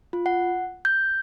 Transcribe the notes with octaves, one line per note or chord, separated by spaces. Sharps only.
F4
F#5
G6